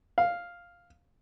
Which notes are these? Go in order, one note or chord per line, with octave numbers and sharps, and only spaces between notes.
F5